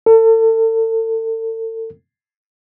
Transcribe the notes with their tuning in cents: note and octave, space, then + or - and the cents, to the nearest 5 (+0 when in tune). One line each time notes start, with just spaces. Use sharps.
A4 +35